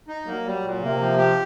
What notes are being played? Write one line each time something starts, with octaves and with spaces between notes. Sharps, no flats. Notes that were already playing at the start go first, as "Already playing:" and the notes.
D#4
F#3 A#3
G3
A#2
C3 A#3
F3
G4